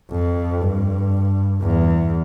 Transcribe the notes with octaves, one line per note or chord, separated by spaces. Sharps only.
F2
G2
E2